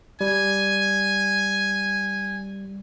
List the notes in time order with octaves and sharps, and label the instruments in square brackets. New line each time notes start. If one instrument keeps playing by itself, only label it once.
[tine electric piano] G3 [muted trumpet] G#5